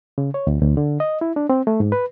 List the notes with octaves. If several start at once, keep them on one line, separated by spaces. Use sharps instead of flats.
C#3
C#5
D2
D2
D3
D#5
E4
D4
C4
A3
G#2
B4